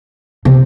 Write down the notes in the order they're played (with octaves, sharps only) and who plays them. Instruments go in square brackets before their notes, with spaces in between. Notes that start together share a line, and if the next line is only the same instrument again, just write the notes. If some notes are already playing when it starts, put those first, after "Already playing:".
[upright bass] C3